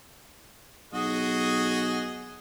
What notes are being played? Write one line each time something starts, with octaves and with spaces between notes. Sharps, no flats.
B1 F#4 G#4 D#5